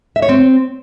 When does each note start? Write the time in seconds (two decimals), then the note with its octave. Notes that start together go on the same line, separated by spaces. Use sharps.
0.16 E5
0.22 C#5
0.29 C4